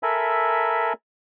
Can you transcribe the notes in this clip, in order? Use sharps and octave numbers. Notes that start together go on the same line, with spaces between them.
A4 A#4 E5 G#5 B5